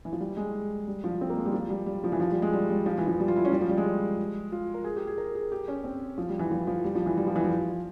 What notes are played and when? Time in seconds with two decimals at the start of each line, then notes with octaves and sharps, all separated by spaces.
0.05 E3
0.12 F3
0.20 G3
0.37 G#3
0.88 G3
1.04 F3
1.21 C4
1.30 A#3
1.37 G#3
1.46 G3
1.53 F3
1.70 G3
1.86 G3
2.04 F3
2.12 E3
2.20 F3
2.31 G3
2.42 G#3
2.53 G3
2.70 G3
2.86 F3
2.98 E3
3.08 F3
3.20 G3
3.28 F4
3.36 E4
3.45 C#4
3.52 G3
3.61 F3
3.69 G3
3.77 G#3
4.52 F4
4.74 A#4
4.84 G#4
4.96 G4
5.07 G#4
5.18 A#4
5.35 G#4
5.52 G4
5.68 C#4
5.84 C4
6.18 F3
6.29 G3
6.39 E3
6.51 F3
6.67 F3
6.84 G3
6.95 F3
7.06 E3
7.17 G3
7.27 F3
7.36 E3
7.44 F3